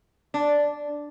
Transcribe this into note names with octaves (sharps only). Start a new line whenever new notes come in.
D4